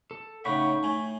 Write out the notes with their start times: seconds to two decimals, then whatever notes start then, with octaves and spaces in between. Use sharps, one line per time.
0.11 A4
0.45 A2 C#3 D#4 F#5 G5 B5 C#6
0.83 A2 A3 G#5